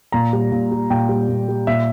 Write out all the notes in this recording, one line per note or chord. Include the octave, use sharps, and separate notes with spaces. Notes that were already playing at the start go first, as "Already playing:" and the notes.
A#2 A#5
G3
A#2
G3
A#2 G5
G3
A#2
G3
A#2 E5